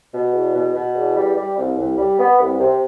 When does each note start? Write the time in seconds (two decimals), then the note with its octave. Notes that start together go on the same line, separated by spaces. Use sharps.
0.13 B2
0.33 E2
0.54 B2
0.75 B2
0.95 E2
1.16 G3
1.37 G3
1.58 C2
1.78 C2
1.98 G3
2.19 B3
2.40 C2
2.60 C3